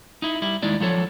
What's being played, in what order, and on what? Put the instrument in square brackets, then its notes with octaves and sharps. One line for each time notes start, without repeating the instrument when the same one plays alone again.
[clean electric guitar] D#4 E4
G3 E4
D#2 G#3 D#4 E4 D5
F3 F#3 A4 C#5